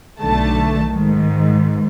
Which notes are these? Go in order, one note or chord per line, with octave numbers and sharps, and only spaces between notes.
B1 D3 A3 A5
G#2 D#3